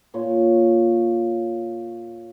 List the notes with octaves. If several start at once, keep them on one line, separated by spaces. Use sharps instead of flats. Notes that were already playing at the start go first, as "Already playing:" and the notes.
A#2 C#5 C6